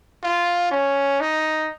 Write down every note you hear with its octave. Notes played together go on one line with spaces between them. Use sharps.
F4
C#4
D#4